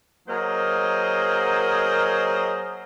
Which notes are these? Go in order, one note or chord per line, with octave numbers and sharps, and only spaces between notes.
F#3 A#3 G#4 A#4 C5 D#5